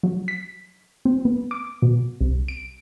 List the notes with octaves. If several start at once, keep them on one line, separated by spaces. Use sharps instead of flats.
F#3
B6
C4
B3
D6
B2
C2
D7